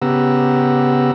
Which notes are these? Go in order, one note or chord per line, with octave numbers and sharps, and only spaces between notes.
C#3 B3 G4 F#5 A#5 E6